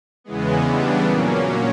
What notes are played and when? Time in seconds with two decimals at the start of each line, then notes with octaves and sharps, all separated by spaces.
0.24 E2 C#3 E3 G#3 B3
0.65 C#3 E3 G3 B3 D4
1.05 A#2 F#3 A#3 C#4